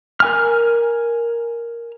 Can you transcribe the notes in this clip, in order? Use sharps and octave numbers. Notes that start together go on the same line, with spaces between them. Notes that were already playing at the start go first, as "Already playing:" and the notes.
A#4 G#5 F6